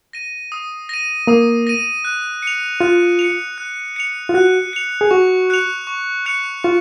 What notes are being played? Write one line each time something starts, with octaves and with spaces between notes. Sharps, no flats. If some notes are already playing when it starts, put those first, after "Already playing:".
A#6 D#7
D#6
A#6 D#7
A#3 D#6
A#6 D#7
F#6
C#7 F7
F4 F#6
C#7 F7
F#6
C#7 F7
F4
F#4 F#6
C#7 F7
G#4
F#4 C#6
F#6 C#7 F7
C#6
F#6 C#7 F7
F4 C#6